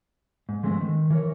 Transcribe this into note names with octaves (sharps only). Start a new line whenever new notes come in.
G#2
F3 G#3 A3 B3 C4
D#3
E3 A#4 C#5